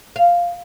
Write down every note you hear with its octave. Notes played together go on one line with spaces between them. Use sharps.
F5